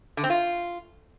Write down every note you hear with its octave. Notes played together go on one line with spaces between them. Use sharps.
D3
C4
F4